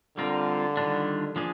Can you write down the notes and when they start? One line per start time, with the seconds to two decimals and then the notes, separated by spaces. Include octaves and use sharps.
0.17 D3 G3 C4 F4 A#4
0.77 D#3 G3 D4 F4
1.36 F3 A#3 D4 G#4